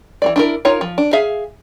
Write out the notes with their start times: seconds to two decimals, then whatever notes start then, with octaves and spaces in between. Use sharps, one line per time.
0.22 E3 A#3 D5
0.36 D4 E4 A#4
0.65 D#4 F4 A#4 C#5
0.81 F3
0.98 D4
1.13 G#4 E5 F5